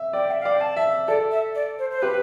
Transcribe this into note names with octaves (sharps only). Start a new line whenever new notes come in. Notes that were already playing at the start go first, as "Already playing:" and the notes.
Already playing: E5
D5 G5
E5
D5 F5
G5
A5
E5
A4 D5
E5
D5
C5
C5
G4 B4